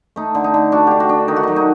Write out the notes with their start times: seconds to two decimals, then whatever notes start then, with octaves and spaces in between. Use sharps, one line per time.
0.16 A3 D#4
0.35 D3
0.44 D#4
0.54 D3
0.72 D4 F#4
0.87 D4 G4
1.00 F#4
1.09 D4
1.28 D#3 D#4
1.36 F#4
1.43 F#3 D#4
1.56 D#4